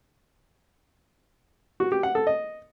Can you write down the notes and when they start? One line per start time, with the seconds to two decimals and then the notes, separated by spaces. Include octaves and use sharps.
1.80 F#4
1.92 G4
2.03 F#5
2.15 A4
2.27 D#5